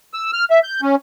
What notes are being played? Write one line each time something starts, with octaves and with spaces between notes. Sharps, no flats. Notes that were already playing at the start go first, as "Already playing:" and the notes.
E6
F6
E5
G6
C#4